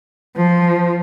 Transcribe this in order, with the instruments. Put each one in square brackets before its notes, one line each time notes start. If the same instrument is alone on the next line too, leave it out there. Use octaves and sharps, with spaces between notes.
[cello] F3